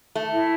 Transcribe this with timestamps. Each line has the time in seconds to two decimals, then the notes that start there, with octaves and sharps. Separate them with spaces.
0.15 A3
0.32 E4